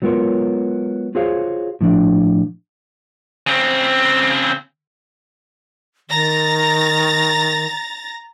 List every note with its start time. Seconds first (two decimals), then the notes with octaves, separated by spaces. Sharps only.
0.02 F#3 G#3 B3 F4 A#4 C#5
1.15 F4 F#4 G#4 C5 C#5 F5
1.81 A2 F3 D4
3.47 C#3 C4
6.09 D#3 A#5 A6 A#6